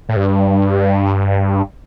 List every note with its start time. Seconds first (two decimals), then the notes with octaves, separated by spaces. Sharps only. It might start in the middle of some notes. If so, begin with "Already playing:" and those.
0.09 A2
0.16 G2